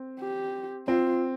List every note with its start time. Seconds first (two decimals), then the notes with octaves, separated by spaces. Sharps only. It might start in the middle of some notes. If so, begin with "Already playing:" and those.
Already playing: C4
0.20 G4
0.88 C4 F4